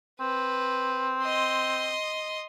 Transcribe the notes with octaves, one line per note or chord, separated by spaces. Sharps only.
C4 B4
D#5 C6